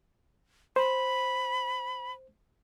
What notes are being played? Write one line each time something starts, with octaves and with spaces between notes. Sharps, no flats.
C5 B5